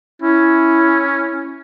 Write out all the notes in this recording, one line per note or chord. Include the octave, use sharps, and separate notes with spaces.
C#4 E4